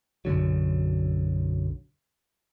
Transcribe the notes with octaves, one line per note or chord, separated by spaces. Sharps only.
B1 F#2 D3 F#3